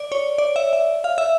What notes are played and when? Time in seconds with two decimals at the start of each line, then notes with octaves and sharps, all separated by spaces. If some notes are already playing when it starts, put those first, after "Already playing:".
Already playing: D5
0.12 C#5
0.38 D5
0.56 E5
0.73 E5
1.04 F5
1.18 E5